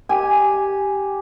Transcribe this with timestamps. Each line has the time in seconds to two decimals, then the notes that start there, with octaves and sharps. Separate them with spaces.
0.09 G4 G#5